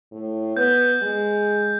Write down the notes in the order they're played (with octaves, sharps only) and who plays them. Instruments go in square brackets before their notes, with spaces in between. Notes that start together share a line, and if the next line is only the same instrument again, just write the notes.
[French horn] A2
[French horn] B3 [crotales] G6
[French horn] G#3